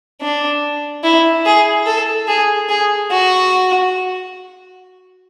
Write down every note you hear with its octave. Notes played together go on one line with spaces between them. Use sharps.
D4
E4
G#4
A4
G#4
G#4
F#4